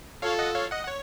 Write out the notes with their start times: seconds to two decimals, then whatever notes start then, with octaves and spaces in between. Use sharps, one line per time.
0.22 F4 A4 C#5 F5
0.39 D#5 F#5
0.55 C#5 F5
0.71 D#5 F#5
0.84 F#5
0.87 C#5